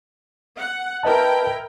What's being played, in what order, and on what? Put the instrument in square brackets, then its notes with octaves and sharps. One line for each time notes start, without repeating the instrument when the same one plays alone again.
[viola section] F#5
[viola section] E4 A#4 G5 [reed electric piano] B4 D#5 A5